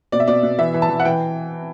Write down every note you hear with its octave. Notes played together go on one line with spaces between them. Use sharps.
B2 D5
E5
B2 D5
B2
E3 E5
E3
A5
E3
F#5
E3 G5